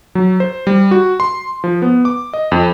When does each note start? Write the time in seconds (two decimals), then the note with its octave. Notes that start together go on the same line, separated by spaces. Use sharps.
0.15 F#3
0.40 C5
0.67 G3
0.91 F#4
1.20 C6
1.64 F3
1.82 B3
2.05 D6
2.33 D#5
2.52 F2